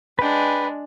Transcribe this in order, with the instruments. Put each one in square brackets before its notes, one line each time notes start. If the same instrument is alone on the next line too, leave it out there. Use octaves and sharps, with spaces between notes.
[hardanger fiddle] G#3 D4 [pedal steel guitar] B4 G5